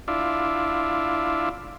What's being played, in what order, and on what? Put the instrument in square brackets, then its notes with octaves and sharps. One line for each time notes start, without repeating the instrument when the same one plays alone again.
[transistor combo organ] D4 E4 F4